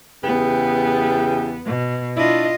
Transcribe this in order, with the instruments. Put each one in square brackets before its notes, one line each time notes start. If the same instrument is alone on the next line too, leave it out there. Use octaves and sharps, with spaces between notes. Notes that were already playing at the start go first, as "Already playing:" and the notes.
[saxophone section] E2 C#3 G4 [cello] B3
[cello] B2
[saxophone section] D4 E4 [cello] F4 D#5